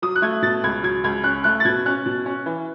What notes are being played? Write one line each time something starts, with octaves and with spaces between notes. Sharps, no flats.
F#3 D#6
F#6
A3 G#6
B2 A6
C#2 G#6
F#3 G#6
C#2 G#6
C#4 F#6
A3 F#6
A6
B2 G#6
C#4 F#6
B2
C#4
E3